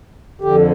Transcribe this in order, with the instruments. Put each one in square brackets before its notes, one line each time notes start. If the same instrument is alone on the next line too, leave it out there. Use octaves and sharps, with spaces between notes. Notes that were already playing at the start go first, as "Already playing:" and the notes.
[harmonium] F2 D3 G4